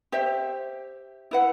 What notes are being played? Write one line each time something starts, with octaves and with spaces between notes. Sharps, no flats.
G4 C5 E5 G5
E4 B4 F#5